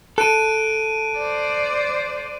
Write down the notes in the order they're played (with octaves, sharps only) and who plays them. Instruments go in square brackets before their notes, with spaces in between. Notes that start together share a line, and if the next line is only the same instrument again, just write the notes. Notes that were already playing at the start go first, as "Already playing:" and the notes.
[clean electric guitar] A4 [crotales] F#6 D7 D#7
[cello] C5 D5